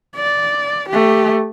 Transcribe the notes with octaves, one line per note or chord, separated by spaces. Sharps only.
D5
A3 G4